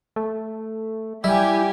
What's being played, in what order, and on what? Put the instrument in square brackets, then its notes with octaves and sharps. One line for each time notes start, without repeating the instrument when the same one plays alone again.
[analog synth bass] A3
[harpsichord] G3 [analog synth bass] E4 [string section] G4 G#5